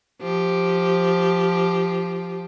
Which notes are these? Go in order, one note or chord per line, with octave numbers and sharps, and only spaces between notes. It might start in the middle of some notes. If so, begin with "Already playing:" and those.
F3 G4